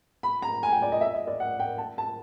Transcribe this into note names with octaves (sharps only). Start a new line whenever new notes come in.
B5
A#5
G#5
G5
D5
D#5
E5
D#5
D5
F#5
G5
A5
A5